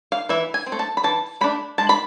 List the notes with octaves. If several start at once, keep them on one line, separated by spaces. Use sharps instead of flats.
F5
E3 E5
G#5
C4
A3
A5
B5
E3 A5
A3 D4 B5
G#3 A5
B5